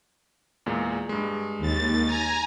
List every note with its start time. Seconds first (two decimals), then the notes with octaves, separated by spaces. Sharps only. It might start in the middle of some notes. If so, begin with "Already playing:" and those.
0.66 E2 A#2 G#3
1.09 G2 G#3
1.59 D#2 A6
2.06 G#5 A#5